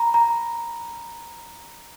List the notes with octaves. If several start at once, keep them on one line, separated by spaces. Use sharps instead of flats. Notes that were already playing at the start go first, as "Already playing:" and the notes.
Already playing: A#5 B5
A#5